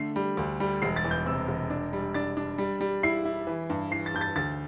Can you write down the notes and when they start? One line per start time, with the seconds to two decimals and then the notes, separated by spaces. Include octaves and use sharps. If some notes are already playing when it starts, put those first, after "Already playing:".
Already playing: D3 A3 C7
0.16 G3
0.37 D2
0.60 G3
0.82 E1 C7
0.96 A6
1.04 E2
1.11 G6
1.26 C3 E6
1.48 E1
1.70 D4
1.93 G3
2.14 D4 A6
2.37 D4
2.58 G3
2.81 G3
3.03 E4 C7
3.25 E4
3.47 E3
3.70 G2
3.91 E3 C7
4.06 A6
4.14 G2 G6
4.21 A6
4.36 D2 A6